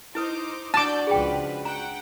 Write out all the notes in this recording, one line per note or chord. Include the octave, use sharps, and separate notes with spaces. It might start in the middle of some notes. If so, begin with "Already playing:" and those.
D#4 E4 B4 C5 D6 D#6
D4 F#4 A5 D6 E6 G6
C#2 F3 G#4 B4 G5
F#5 G5 A#5